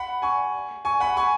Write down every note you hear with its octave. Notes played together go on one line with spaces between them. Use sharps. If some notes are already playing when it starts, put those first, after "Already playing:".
Already playing: F#5 B5
G#5 C#6
G#5 C#6
F#5 B5
G#5 C#6